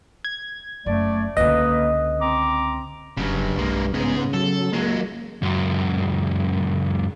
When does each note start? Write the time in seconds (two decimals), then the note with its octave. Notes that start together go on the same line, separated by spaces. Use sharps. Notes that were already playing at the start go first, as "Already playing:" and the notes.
0.25 G#6
0.86 F#1 A3 D5
1.37 C#2 D3 A#3 B4 D#5
2.21 C4 A#5 D6
3.17 F1 G2 C#3 F#3
3.58 B1 G#3 A#3
3.94 G#2 C#3 B3 G#4
4.33 F#3 A4
4.73 C#2 F#3 G#3 A#3
5.42 C#2 F#2